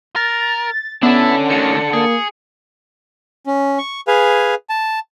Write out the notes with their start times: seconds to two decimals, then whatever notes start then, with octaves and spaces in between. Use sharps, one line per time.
0.16 A#4 A6
1.03 B3 C#4 D4 E4 A4
1.50 D2 D#3 C#7
1.93 A#3 G#4
3.46 C#4
3.78 C#6
4.08 G#4 B4 F5 G#5
4.70 A5